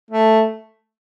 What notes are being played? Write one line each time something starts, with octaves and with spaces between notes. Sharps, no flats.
A3